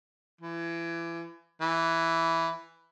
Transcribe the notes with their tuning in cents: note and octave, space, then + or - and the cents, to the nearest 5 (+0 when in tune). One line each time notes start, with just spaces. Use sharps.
E3 +30
E3 +5